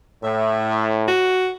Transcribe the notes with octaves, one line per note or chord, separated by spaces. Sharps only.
A2 E5
F#4